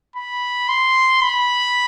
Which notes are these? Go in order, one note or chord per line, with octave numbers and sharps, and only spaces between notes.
B5
C6
B5